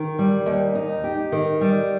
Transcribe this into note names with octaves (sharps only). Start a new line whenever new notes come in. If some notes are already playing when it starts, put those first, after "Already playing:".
Already playing: D#3
G3
D#2
D#4
G4
D#3
G3